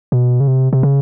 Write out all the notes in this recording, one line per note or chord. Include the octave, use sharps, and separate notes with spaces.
B2
C#3
C3
C3
C#3